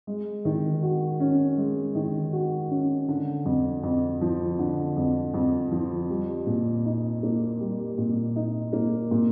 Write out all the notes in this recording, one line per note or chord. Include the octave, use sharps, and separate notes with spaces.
G#3
D#3
F#4
C#4
G#3
D#3
F#4
C#4
D3
F2
F2
F3
D3
F2
F2
F3
G3
A#2
D#4
A#3
G3
A#2
D#4
A#3
A#2